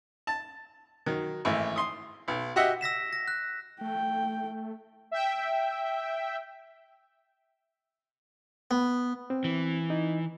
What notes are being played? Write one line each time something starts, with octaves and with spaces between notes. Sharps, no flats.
A5
D#3 F#3
G#1 E3 A3
C6 D#6
B1
F#4 G4 D#5 E5 F#5
E6 A#6 B6 E7
A#6
F#6
A3 G5
E5 G5
B3
C4
E3
D#4